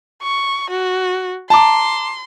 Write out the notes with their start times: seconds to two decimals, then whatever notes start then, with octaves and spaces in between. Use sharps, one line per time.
0.23 C#6
0.70 F#4
1.50 A5 A#5 C6 D6